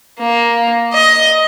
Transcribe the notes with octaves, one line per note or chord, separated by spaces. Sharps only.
A#3
D#5